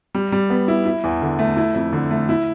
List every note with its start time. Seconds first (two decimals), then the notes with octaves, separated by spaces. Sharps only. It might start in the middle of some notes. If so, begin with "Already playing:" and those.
0.15 G3
0.32 G3
0.50 B3
0.68 E4
0.86 E4
1.04 E2
1.22 D3
1.39 A3
1.57 E4
1.75 F2
1.93 D3
2.11 A3
2.29 E4